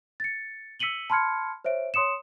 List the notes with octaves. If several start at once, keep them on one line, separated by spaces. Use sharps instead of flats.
A6 C#7
E6 B6 C#7 D#7 F#7 G7
A5 B5 C6 F6 G#6 C#7
C5 C#5 E5 D7
C#5 C6 D#6 C#7 E7